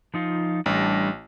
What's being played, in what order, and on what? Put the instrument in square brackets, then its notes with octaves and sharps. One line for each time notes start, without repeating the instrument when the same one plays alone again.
[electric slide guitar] F3 D#4 F4
[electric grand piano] A1 [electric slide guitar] G3 D4